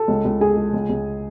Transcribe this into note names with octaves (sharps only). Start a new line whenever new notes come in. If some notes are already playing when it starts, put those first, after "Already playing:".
Already playing: A4 A5
C#2
C#2
G#3 G#4 G#5
G#3
C#2
C#2